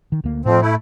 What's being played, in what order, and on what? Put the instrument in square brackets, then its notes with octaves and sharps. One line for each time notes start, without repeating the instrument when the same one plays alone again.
[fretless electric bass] D#3
D2 A#3
[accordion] F2 F3 C4 [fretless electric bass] A2
[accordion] A3 E4